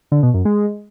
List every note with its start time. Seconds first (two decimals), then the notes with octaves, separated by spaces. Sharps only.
0.12 D3
0.23 B2
0.34 F#2
0.45 G#3